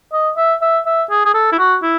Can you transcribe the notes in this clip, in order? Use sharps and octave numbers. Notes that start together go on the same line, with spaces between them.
D#5
E5
E5
E5
G#4
G#4
A4
E4
F#4
E4